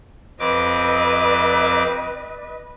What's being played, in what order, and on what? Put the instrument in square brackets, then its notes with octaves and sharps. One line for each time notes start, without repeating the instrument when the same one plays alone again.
[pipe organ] F2 C4 D6 [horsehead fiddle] B4 D#5